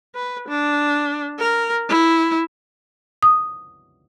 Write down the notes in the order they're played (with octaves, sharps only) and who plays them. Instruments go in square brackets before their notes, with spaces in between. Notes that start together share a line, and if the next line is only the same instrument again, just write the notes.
[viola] B4
D4
A#4
E4
[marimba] D#6